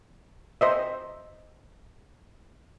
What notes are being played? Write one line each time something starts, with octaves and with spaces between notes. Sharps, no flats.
C5 D#5 E5